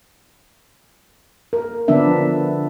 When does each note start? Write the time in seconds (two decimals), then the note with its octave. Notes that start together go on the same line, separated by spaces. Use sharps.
1.53 A#4
1.88 D3 F3 B3 D4 E5